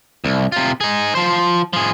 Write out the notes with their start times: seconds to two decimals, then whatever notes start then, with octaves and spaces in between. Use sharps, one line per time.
0.24 C2
0.52 C3 F4
0.81 D#4 G#4
1.15 F3 C5
1.73 F3 G#4